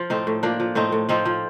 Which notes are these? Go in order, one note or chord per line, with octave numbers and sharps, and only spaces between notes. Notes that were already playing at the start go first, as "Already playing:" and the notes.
Already playing: F3 F4
A2 C4 D#4
A2
F3 A#3 D4
F3
A2 C4 D#4
A2
F3 C4 D#4
F3